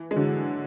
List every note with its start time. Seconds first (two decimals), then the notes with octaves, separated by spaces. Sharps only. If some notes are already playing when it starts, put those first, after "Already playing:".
Already playing: E3
0.11 G#3
0.16 D3 F#3